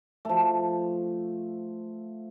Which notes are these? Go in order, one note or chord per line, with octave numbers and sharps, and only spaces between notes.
F3 A3